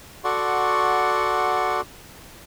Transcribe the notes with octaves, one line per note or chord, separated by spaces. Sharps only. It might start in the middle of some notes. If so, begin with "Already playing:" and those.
F#4 A4 D5 F#5 C6 C#6